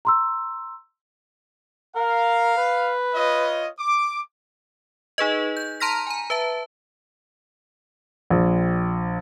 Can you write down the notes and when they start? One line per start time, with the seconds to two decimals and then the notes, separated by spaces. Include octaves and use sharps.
0.05 A#5 C6 E6
1.96 A#4 F5
2.57 B4
3.13 F4 C#5 D#5
3.78 D6
5.18 D#4 G#4 B4 D#5
5.57 G6
5.80 A5 A#5 C6 F6 A#6 B6
6.07 G#5 A#5
6.30 B4 E5 A5
8.30 A#1